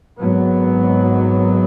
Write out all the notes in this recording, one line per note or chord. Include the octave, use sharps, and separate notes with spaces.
G#1 G#2 F#3 B3